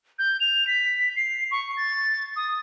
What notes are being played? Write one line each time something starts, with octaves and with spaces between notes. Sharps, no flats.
G6
F7
B6
C7
C#6
A6
D#6